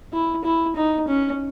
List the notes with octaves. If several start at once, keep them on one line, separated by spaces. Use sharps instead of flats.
E4
E4
D#4
C#4